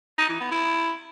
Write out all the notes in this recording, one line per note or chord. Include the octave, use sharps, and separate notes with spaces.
D#4
E3
B3
E4